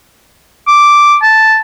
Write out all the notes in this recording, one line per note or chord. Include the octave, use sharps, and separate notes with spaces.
D6
A5